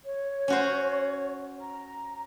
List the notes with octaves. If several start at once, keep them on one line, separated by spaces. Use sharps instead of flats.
C#5
C#4 F#4 C5
A#5